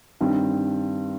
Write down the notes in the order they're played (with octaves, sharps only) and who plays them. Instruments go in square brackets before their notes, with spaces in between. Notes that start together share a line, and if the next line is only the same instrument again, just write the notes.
[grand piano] G2 D#3 G3 C4